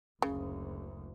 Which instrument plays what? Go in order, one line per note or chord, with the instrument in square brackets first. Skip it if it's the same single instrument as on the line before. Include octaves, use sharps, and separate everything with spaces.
[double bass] F#1 D2 [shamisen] C#3